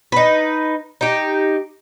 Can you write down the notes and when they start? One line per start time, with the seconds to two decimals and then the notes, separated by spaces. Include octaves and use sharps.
0.12 D#4 B4
1.01 D#4 G4